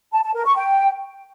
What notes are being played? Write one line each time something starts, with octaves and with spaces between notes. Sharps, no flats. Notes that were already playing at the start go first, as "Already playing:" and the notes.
A5
A5
A#4
C#6
G5